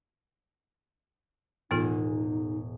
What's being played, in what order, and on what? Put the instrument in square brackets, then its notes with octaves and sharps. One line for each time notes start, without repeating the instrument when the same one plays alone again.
[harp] E1 A2 G#4 [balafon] B3 F4 A4 [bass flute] D#4